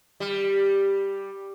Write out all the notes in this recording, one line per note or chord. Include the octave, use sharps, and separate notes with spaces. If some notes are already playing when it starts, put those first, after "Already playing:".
G3